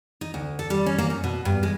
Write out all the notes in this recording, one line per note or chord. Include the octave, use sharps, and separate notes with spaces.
D#4
D2
A4
G3
C#4
A#3
F#2
B2
G2
G#3